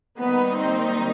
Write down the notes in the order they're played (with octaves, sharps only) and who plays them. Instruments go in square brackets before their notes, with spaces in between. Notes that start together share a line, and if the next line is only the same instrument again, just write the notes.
[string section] D#3 G3 A#3 B3 D#4 B4
C4 C5